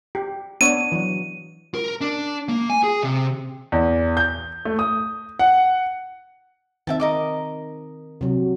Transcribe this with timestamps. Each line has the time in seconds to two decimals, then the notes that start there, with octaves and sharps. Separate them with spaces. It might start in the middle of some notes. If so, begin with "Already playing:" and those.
0.15 G4
0.61 B3 D4 C#5 D#7
0.92 E3 F#3
1.74 A#4
2.01 D4
2.49 A#3
2.70 G#5
2.83 G#4
3.03 C3
3.72 E2
4.17 G6
4.65 A3
4.79 D#6
5.39 F#5
6.87 D#3 C4 E5 G5 A5
7.00 A#4 D#5 D6
8.21 C3 F#3